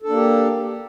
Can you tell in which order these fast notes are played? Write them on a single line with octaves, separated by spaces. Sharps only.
A4 D4 A#3 G4